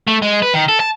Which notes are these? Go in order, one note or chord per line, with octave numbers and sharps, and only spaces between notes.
A3
G#3
B4
D#3
A4
A5